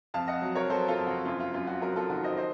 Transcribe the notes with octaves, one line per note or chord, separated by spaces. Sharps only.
F2 F5 A5
D#5 F#5
F#3
A#4 C#5
F#3 A4 C5
F4 A4
F2
F#4
F#2 F4
F4
F#2 F4
F#4
F#3 F#4 A#4
F4 A4
D#3 F#4
C5 D#5
C5 D#5